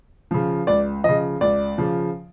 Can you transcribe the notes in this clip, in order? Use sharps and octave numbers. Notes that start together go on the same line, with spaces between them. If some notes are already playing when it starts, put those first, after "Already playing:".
C#3 F3
C#2 D5
C#3 F3 D#5
C#2 D5
C#3 F3